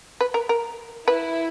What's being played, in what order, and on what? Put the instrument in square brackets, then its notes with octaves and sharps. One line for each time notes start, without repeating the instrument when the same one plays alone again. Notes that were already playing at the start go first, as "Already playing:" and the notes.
[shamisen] B4
A#4
A#4
[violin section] E4 [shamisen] B4